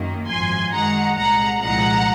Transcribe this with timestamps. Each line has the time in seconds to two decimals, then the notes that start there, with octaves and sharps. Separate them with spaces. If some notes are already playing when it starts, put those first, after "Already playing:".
Already playing: F#2 D#3 A#3
0.28 G#1 F#2 F3 G#5 C6
0.72 F#2 D#3 G#3 F#5 A#5
1.17 C2 A#2 G#3 F#5 A#5
1.61 C2 A#2 F3 G#3 F#5 A#5